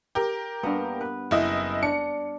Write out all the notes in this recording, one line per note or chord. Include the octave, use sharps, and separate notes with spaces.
G4 A#4
G2 A#3 B3
B4
F#1 E4 D#5
D4 C#7